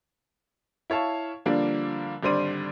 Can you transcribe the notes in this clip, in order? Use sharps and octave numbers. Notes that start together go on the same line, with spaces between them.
E4 C#5 F5 A5
D3 F3 G3 A#3 D4
G#1 D3 G3 C5 D5 D#7